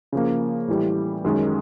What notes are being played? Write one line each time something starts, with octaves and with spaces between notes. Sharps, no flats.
C#3 F3 A#3
A2 E3 G3
F#2 D#3 G#3 C#4